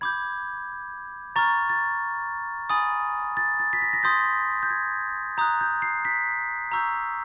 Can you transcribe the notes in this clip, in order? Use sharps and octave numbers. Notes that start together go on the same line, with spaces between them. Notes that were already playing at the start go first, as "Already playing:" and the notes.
B5 D6 G6 G#6
A#5 C#6 F6 A6
A6
G#5 B5 D#6 A6
A6
A6
B6
A#6
A#6
C6 D#6 G6 A6
G6
G#6
A#5 D#6 F#6 G6
G6
C7
B6
A#5 C#6 E6 G6